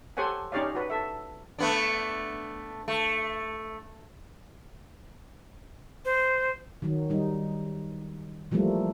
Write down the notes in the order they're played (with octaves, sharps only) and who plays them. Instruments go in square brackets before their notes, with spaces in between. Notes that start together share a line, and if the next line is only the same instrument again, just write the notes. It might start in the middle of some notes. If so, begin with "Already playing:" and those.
[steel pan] G4 A4 C5 C#5 F#5 G#5
C#4 D#4 G4 C#5 D5 F5
F#4 B4
A4 E5
[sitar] A3 B3 D4
A3
[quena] C5
[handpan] D#3 F#3
G3 D#4
E3 F3 G3 A3 A#3